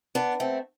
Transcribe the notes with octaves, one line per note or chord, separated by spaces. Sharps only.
B3 D4
A3 C4